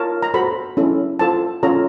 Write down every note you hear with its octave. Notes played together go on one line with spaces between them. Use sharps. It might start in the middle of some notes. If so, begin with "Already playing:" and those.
Already playing: F4 A#4 C#5 A5
A#5
F#4 A4 C5 B5
C#4 E4 A4
F4 A4 C5 A5
C#4 F4 A4 C#5 A#5